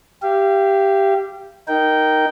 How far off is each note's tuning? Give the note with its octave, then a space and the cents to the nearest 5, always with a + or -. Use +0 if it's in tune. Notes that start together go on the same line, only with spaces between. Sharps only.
G4 +0 F5 -40
D#4 +0 A#4 +0 G5 -15